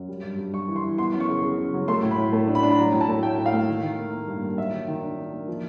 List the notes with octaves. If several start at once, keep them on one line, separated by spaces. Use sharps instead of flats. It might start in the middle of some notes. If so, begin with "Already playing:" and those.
Already playing: F#2
G3
G2
G2
G3 C#6
E3
C6
E3
B3 C6
F#2
C#6
C#3
C#3
C#3
F#3
A3 C6
A2
B5
A2
A3
D4
B5
D4
B5
F#3 A#5
A2
A5
A3
A2 G5
A3
F5
A3
D#3
D#3
A#3
A#3
G2
A#3
F#3 E5
D#3
D#3
D4
D4
A#3
F3